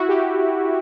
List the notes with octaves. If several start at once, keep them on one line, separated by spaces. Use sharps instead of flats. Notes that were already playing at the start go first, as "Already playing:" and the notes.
Already playing: E4 F#4
G4